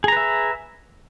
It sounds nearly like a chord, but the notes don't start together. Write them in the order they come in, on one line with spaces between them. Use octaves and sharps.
G#4 A#5 B4 E5